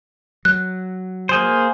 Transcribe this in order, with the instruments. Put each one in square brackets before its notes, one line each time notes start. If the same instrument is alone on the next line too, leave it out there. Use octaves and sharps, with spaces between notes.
[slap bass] F#3 [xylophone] F#6
[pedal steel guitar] A#3 G#4 C5